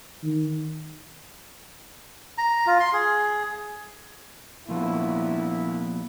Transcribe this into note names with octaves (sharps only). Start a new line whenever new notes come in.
D#3
A#5
F4
C6
G#4
C2 A#2 F3 B3 E4